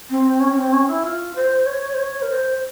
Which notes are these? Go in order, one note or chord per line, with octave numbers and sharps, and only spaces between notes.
C4
C#4
C#4
C4
C#4
E4
F4
C5
C#5
C5
C#5
A#4
C5